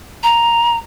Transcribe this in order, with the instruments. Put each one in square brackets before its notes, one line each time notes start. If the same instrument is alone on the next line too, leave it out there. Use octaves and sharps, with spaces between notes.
[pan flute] A#5